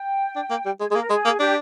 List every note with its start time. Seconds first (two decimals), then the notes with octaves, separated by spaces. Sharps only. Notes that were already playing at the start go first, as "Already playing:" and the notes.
Already playing: G5
0.36 D4
0.50 A#3
0.66 G3
0.80 G#3 G#4
0.90 G#3 G#4
0.95 A#3
1.00 A#4
1.10 G#3 G#4
1.25 A#3
1.40 D4 G4